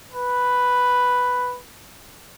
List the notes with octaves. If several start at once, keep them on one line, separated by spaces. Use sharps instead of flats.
B4